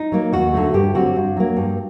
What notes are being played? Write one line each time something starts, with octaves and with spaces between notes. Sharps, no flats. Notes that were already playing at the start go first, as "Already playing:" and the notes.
Already playing: D#4
F#3 A#3
D#2 F#4
D3 F#3 A3
G2 G4
D3 F#3 C4 F#4
G2
F#3 A#3
G2